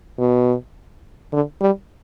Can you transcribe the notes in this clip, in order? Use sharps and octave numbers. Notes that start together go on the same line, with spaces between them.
B2
D3
G3